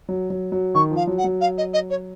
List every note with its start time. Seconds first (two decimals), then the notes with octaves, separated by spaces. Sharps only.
0.09 F#3
0.30 F#3
0.52 F#3
0.75 D#3 C#6
0.91 F3
0.96 F5
1.07 F#3
1.18 F#5
1.24 F#3
1.41 F5
1.58 D#5
1.73 D#5
1.90 C#5